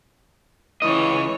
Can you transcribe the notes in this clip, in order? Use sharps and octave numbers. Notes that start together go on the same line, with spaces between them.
C#2 E3 C#5 D#5